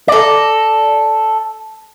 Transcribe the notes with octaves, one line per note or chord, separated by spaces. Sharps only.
A4 D5 A#5